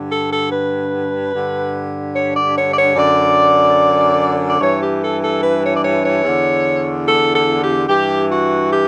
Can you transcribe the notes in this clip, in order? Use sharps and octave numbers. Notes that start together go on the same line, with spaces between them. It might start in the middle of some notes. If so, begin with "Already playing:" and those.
Already playing: G2 D3
A4
A4
B4
G2 D3
C#5
D5
C#5
D5
C#5
F#2 D3 D5
D5
G2 E3 C#5
G4
A4
A4
B4
C#5
D5
C#5
C#5
E2 D3
A4
A4
G4
G2 E3 G4
F#4
G4